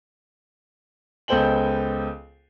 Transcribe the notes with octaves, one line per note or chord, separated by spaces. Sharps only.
C#2 B3 A4 C5 G5 F#7